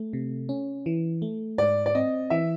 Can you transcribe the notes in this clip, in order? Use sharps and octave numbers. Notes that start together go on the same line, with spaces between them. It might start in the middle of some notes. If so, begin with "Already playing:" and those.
Already playing: A3
C3
C#4
E3
A3
G#2 D5
D5
C4 D#5
E3 E5